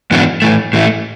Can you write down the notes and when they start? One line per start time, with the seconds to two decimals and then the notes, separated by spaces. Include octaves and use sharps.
0.11 G#2 E3 B3 D4 F#4
0.42 A2 E3 A3
0.73 A2 E3 A3